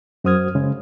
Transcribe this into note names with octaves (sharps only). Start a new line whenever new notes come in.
F#2 F#4 C5 D#6 F6 G#6
C#3 G#3